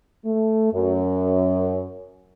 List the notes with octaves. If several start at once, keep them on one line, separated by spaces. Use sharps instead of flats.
A3
F#2